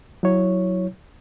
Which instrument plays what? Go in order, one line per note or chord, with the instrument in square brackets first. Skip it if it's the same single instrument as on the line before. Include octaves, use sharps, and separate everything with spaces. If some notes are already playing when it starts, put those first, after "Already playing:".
[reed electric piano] F#3 E4 C#5